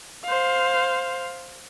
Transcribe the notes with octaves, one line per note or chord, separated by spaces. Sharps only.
C5 F5